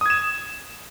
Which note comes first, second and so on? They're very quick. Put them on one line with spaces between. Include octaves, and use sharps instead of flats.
D#6 G#6 E7